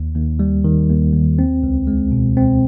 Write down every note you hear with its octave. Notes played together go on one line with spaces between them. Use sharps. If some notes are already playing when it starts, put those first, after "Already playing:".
Already playing: D#2
D#2
G3
D#3
D#2
D#2
C4
C#2
G#3
B2
C4